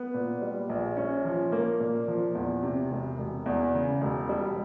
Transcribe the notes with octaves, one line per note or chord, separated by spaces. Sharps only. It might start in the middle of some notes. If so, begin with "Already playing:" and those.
Already playing: B3
A#2
G3
A#1
C#4
F3
A#3
A#2
F3
E2
C3
E1
E1
E2
C#3
E1
G3